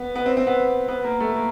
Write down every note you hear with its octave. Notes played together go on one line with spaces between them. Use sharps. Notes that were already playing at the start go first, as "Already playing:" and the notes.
Already playing: B3
B3
C4
C4
B3
B3
A#3
A3
A#3